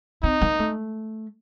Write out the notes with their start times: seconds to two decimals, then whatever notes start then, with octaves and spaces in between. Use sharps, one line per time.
0.23 C4 D#4
0.42 A#3
0.59 A3